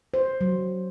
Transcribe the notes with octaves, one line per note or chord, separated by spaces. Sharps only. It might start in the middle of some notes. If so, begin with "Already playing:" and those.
C5
F#3